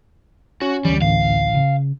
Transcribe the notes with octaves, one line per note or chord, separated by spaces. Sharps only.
C#4 F#4
D2 E3 G3
A1 F5
C#3